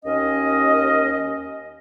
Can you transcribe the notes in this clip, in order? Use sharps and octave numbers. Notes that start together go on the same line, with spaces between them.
D#2 C#4 D#5